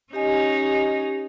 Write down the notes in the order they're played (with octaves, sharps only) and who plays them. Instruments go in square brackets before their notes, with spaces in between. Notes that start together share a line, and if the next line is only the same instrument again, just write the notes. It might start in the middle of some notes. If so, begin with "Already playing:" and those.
[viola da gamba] C#4 D#4 [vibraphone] G4 D#5 G#5